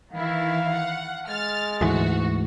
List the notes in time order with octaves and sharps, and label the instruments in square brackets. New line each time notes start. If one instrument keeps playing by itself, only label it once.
[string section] D#3 E3 E4 [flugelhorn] F5
[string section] F#5
[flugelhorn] G#3 [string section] F6 A6
[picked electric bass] D2 G#2 E3 [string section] F#4